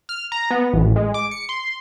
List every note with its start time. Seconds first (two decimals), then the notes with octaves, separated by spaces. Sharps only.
0.09 F6
0.32 A#5
0.51 B3
0.73 A1
0.96 G#3
1.14 D6
1.31 C#7
1.49 C6